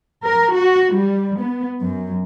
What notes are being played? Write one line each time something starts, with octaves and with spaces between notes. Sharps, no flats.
A#4
F#4
G3
B3
F#2